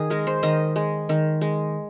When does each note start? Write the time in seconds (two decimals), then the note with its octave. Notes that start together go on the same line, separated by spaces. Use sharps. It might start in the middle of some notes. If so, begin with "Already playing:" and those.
Already playing: D#3 G#4
0.10 G#3 A#4
0.27 C5
0.43 D#3 D#5
0.76 G#3
1.09 D#3
1.41 G#3